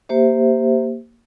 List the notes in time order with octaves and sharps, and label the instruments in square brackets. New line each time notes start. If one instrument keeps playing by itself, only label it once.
[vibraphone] A#3 G4 C5 E5